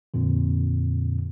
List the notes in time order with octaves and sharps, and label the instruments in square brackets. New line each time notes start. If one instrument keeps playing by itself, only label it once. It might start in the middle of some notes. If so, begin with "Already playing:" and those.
[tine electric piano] F2 A#2 D3